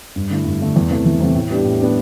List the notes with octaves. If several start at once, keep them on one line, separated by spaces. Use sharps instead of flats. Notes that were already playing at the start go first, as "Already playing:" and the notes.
G2
D3 A3 E4
G2
D3 A3 E4
E2
C3 E3 A3
E2
C3 E3 A3
A2
G3 B3 D4 G4
A2
G3 B3 D4 G4